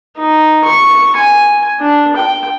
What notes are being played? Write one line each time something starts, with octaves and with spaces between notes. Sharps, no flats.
D#4
C#6
G#5
D4
G5